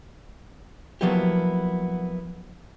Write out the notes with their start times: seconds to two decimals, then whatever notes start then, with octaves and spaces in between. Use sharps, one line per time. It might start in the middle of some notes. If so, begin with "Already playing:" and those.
1.01 F3 F#3 A#3 B3 E4 G4